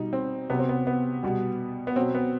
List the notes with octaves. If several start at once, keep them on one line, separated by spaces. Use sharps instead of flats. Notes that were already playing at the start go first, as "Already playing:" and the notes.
Already playing: B2 G3 D#4
C4
C3 F#3 B3
C4
B3
B3
B2 G3
B3
B2 F#3 C4
B3